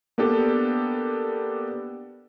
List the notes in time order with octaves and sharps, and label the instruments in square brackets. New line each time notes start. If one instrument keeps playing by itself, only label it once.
[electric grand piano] A#3 B3 D4 G4 A4